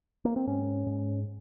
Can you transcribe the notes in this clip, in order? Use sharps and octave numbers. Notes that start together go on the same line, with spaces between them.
A#3
C4
G#2 C#4
G#2